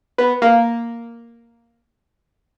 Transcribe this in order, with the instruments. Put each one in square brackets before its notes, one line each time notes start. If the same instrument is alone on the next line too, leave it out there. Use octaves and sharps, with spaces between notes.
[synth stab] B3
A#3